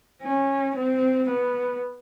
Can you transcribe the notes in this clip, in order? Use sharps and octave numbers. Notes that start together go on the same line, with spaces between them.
C#4
C4
B3